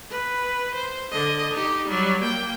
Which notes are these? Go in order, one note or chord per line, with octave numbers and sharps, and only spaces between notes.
B4
C5
D3 D#5
D#4 G4
F#3 G3
A#3 G5